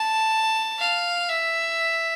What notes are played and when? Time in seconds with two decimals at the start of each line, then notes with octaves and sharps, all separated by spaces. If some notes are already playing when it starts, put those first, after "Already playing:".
Already playing: A5
0.79 F5
1.29 E5